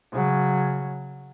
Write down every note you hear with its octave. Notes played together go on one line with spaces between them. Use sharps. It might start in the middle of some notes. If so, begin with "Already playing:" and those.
C#3 F#3